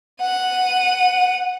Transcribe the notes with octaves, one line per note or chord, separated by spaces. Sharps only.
F#5 D#7